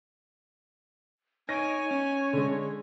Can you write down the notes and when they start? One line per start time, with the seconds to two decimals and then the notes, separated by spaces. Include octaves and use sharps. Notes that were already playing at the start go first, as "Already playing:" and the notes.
1.49 D#4 C#5 G#5 A#6 D7
1.91 C#4
2.33 D3 G#3